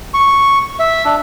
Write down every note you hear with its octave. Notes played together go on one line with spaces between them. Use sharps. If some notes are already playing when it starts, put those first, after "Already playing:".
C#6
E5
D4